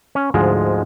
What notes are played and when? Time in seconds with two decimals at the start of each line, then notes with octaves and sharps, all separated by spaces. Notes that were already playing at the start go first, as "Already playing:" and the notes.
0.15 C#4
0.34 D2 G#2 F3 G#3